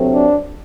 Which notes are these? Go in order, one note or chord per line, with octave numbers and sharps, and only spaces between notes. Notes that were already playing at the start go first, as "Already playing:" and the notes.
Already playing: D2 C3 F#3 A3 C4
D4